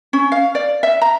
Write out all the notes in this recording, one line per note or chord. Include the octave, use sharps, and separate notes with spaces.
C#4
F5
D5
E5
A#5